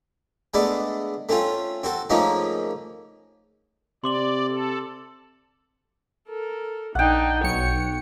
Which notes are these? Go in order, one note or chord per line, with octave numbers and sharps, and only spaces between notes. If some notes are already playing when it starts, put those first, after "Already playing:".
G#3 A3 B3 D4 A4
A3 C4 C#4 F4
C4 F#4 A4
G#2 F3 A3 A#3 C#4 D#4
C3 D5 C6 D6 F#7
A4
A4 A#4
A#1 D4 D#4 F#5 G5
B1 C#5 C#7